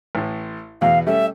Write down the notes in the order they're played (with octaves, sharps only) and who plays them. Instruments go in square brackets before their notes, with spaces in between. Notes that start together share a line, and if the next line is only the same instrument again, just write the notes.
[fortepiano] A1 A2
[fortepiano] E2 B2 [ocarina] F5
[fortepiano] G3 A3 C#4 [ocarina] E5